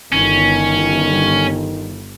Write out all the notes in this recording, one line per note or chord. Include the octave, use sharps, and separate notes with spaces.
G1 D#3 C#4